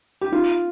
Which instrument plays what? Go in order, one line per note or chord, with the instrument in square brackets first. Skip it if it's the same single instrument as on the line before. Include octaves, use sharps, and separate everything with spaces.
[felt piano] G4
F4